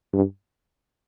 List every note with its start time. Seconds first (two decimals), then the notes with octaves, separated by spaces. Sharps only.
0.13 G2